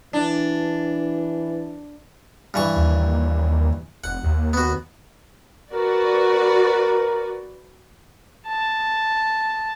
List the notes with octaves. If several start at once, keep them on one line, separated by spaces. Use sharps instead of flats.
E3 D4
G2 E3 C#6
D#2
F1 F#5
D#2
B3 F#4
F#4 A#4 B4 D5
A5